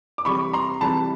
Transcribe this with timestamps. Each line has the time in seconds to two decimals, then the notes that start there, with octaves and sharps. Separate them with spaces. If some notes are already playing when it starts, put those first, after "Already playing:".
0.18 D6
0.25 C3 E3 G3 B5 C#6
0.53 A#5 C6
0.81 C3 E3 G3 A5 B5